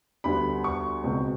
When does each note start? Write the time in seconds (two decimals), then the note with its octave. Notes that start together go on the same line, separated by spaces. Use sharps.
0.24 D2 D3 G3 B3 B5
0.64 C#6
1.03 C#2 B2 G#3 C4